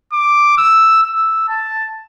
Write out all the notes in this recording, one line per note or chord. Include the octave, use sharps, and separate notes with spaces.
D6
E6
E6
A5